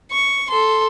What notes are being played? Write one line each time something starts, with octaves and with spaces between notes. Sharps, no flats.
C#6
A4 C6